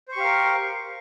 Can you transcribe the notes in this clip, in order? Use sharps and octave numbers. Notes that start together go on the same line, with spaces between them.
G4 A#4 C5 F5 C#6